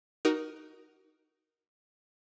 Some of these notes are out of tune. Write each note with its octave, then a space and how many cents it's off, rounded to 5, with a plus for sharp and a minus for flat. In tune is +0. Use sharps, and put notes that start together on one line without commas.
D#4 -5 F#4 +25 A#4 +15